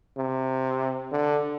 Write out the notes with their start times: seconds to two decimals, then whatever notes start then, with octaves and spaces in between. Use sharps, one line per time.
0.17 C3
1.12 D3